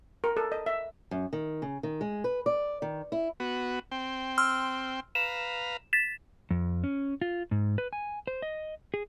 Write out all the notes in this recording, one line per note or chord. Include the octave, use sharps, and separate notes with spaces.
A#4
A4
D#5
E5
F#2
D#3
C#3
D#3
G#3
B4
D5
D#3
E4
B3 F#4
C4 G5
C6 E6 F6
B4 F5 A#5 E7
A6 B6 E7
F2
C#4
F4
G#2
B4
G#5
C5
D#5
G#4